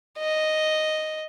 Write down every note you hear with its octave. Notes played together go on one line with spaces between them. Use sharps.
D#5